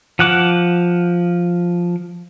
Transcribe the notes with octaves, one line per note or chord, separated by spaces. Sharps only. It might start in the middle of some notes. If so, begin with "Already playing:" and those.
F3 F#5 D6